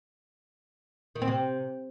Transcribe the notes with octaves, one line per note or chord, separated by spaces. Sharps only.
D#3
C4
C3